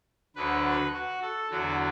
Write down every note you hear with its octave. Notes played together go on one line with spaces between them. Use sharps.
D2 D3 F#3 B4
F#4
A4
E2 D3 F#3 F#4